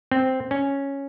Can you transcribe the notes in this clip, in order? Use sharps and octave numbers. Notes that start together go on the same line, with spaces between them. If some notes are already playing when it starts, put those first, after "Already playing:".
C4
C#4